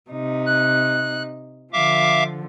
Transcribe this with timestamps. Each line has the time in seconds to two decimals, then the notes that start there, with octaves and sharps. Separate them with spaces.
0.10 C3 D#4
0.46 F#6
1.73 D3 F3 E5 F5 D6